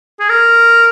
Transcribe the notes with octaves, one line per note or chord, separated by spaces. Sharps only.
G#4
A#4